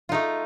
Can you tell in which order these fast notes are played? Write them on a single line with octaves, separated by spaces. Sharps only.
F4 D#4 A3